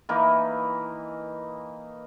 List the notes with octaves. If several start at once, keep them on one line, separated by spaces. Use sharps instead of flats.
E3 A#3 D#4